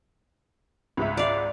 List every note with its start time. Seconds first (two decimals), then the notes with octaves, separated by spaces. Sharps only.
0.97 C#2 G#2 E5
1.17 D5 F5